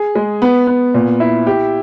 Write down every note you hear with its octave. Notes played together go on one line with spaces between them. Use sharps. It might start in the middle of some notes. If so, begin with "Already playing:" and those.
Already playing: G#4
G#3
B3
B3
A#2
E4
G4